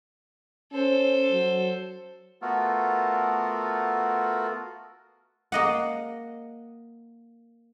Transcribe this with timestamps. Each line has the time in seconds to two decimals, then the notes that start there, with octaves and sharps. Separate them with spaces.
0.73 C#4 A4 C5
1.31 F#3
2.42 A3 B3 F4 F#4 A4 A#4
5.52 A#3 D#5 F#5